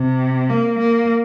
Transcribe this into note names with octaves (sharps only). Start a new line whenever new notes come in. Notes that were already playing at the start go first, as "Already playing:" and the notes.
Already playing: C3
A#3
A#3